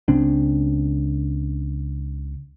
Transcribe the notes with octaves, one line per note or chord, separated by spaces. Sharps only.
C#2 C#3 C4 D4